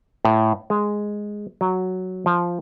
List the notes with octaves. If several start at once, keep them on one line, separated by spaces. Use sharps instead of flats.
A2
G#3
F#3
F3